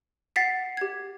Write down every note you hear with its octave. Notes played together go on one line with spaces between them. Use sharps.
F#5 A6 B6 C7
G4 G#6